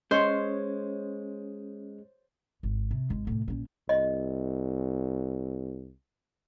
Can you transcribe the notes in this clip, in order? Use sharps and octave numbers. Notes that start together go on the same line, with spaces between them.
G#3 C#4 C5 C#5 D#5 C6
G#1
C3
G#1 G#3
A2 C3
A#1 C#4
C2 D#5